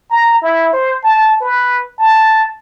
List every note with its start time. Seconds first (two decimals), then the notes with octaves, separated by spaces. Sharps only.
0.11 A#5
0.42 E4
0.73 C5
1.04 A5
1.41 B4
1.99 A5